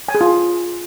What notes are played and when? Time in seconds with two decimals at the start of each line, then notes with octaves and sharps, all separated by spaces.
0.08 G#5
0.15 G#4
0.21 F4